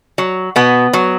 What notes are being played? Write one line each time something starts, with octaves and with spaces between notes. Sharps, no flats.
F#3
B2 B3
F#3